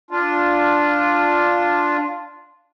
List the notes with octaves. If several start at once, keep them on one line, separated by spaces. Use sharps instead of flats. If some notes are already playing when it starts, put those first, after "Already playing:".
D4 F4